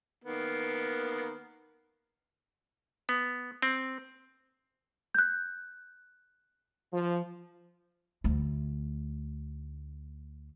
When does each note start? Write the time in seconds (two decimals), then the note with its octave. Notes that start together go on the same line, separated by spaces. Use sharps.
0.24 D#3 A#3 B3
3.09 B3
3.62 C4
5.15 F#6 G6
6.93 F3
8.24 D2 A3